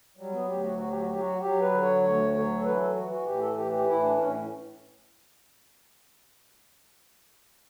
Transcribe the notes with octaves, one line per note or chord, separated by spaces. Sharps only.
F#3 G3
B3
D2 G4
F#4
F#3 F#4
G4
F#4
F#3 G4
F#4
F#3 G4
B4
D3
C#5
D2 C#5
F#3 C#5
A4
E3 B4
A4
E3 F#4
F#4
A2 G4
A4
E3 G4
G4
A2 E4
D4
A2 C#4